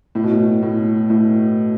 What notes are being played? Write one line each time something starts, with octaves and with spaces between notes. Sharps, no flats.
A2
B2
A2
A2
A2